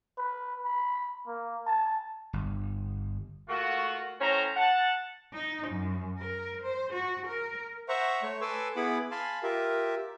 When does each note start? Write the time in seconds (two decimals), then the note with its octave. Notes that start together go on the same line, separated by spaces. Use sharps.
0.18 B4
0.65 B5
1.27 A#3
1.67 A5
2.33 G1
3.48 A3 A#3 F4 F#4
4.21 A2 C#4 C5 A#5
4.56 F#5 A5
5.33 D#4
5.68 F#2
6.18 A#4
6.62 C5
6.93 F#4
7.27 A#4
7.89 C5 E5 F#5 A#5 C#6
8.23 A3 C#5 C#6
8.41 A4 B4 G#5 C6 D6 E6
8.76 B3 E4 G#4 F#5 B5 D6
9.11 F5 G#5 A5 B5 C6
9.43 F4 G4 A#4 E5